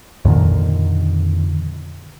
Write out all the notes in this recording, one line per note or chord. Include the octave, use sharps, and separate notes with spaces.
F2 A#2 D3 D#3